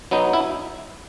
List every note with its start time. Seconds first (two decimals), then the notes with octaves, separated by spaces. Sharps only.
0.11 F#3 B3 D#4
0.33 E4